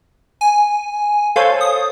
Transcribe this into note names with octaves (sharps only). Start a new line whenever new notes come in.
G#5
A4 C5 C#5 F5
D#6